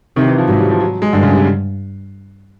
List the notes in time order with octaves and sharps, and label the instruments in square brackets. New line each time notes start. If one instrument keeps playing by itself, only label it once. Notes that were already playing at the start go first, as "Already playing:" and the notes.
[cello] C3 [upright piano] D#3
[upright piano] E3
F3
[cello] G#2 [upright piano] F#3
[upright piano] G3
F3
F#3
G#3
[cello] G2 [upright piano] D3
[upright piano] C#3
C3